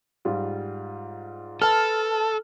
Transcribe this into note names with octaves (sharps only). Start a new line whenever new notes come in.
G#2 G3 F4
A4 B4 A5 F6